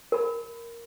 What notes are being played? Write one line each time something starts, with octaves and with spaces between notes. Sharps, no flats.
A#4 B5